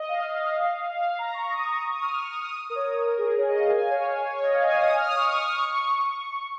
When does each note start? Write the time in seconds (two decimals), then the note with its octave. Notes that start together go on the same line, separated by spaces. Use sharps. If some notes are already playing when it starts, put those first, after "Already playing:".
Already playing: D#5
0.09 F5
0.86 F5
1.02 F5
1.19 A#5
1.34 C#6
1.50 D#6
1.61 C#6
1.71 A#5
1.82 C#6
1.91 D#6
2.02 F6
2.44 D#6
2.60 D#6
2.70 A#4
2.75 C#5
2.86 C#5
2.96 A#4
3.07 A#4
3.18 G#4
3.28 A#4
3.38 C#5
3.48 D#5
3.59 F5
3.69 G#5
3.80 F5
3.90 C#5
4.33 C#5
4.42 D#5
4.53 F5
4.64 G#5
4.79 D#6
4.96 F6
5.06 D#6
5.16 C#6
5.27 D#6
5.37 F6
5.47 D#6
5.58 C#6
5.68 C#6
5.80 C#6